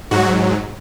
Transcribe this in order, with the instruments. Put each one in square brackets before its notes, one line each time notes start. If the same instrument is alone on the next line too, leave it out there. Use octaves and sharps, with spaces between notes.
[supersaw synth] G#2 F#3 F#4